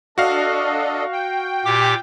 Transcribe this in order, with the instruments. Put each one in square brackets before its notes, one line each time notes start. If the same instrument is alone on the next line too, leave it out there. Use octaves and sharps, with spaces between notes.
[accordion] D4 A4 D#5 [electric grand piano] F#4 F5
[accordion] G5
[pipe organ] A#2 G4 D6